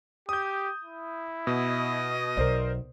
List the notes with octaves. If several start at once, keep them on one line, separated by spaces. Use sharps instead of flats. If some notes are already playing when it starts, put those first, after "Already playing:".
G4 D#6 G6
E4
B2 D#5
B1 A#4 C5 D5